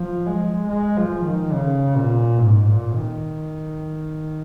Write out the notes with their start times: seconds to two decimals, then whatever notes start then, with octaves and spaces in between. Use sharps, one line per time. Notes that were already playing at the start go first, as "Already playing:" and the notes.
Already playing: F3
0.26 G#3
0.68 G#3
0.97 F3
1.26 D#3
1.53 C#3
1.96 A#2
2.38 G#2
2.66 A#2
2.95 D#3